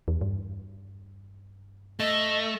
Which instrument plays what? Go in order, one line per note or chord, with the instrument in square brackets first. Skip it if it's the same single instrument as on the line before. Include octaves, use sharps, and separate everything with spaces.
[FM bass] E2
G2
[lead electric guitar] A3 [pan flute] D#5